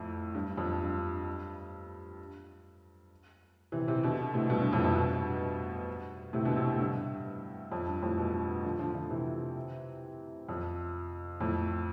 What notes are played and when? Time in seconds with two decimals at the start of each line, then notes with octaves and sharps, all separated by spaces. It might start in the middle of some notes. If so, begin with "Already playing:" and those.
Already playing: F2 A2
0.34 G2
0.58 F2
0.81 G2
3.72 C3 E3
3.88 C3 E3
4.03 B2 D3
4.34 A2 C3
4.50 G2 B2
4.60 G2
4.72 F2 A2
4.84 F2 A2
4.95 G2 B2
6.33 A2 C3
6.45 B2 D3
6.56 A2 C3
6.80 G2
7.72 F2
7.88 G2
8.02 F2 A2
8.18 G2 B2
8.65 D3 F3
8.79 D3 F3
8.94 D3 F3
9.10 C3 E3
10.49 F2
11.41 F2 A2